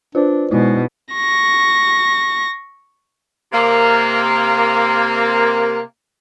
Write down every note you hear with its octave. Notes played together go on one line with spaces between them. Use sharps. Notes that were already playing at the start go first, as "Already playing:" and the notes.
D4 F4 B4 C5 D5
B2 G#3 D#4 E4
C#6 A#6
C3 A#3